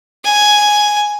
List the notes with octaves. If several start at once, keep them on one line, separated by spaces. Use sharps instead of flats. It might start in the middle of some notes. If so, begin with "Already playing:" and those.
G#5